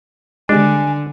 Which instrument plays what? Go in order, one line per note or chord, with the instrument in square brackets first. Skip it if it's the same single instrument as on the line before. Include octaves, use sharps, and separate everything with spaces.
[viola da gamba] D3 [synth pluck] G3 G#3 [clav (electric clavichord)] D4 [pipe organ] G#5